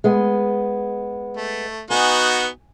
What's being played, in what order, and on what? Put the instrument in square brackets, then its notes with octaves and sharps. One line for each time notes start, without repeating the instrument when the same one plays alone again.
[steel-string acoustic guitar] G#3 B3
[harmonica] A3
[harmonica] B3 D#4 F#4 [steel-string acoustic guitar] G#5